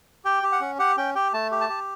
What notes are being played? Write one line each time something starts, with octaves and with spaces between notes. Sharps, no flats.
G4 G5
G4
F#5
C#4
G4 F#5
C#4 G5
G4 G5
A3 A5
G4
A5
G4